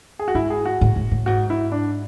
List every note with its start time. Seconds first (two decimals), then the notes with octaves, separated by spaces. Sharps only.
0.19 G#4
0.28 F#4
0.34 G#2 E4
0.50 G#4
0.66 F#4
0.81 A2
0.96 A2
1.11 A2
1.26 G#2 F#4
1.50 E4
1.72 D4